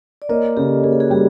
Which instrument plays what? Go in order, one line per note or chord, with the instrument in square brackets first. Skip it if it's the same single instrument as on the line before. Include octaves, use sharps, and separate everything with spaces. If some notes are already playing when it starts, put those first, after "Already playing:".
[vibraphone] D5
[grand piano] A#3 [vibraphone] C#5 D#5
[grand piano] C#3 [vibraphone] G4 A4
[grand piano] A#3 [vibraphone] G#4
[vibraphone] A4
F#4 G#4
[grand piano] G3 [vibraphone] G4 A4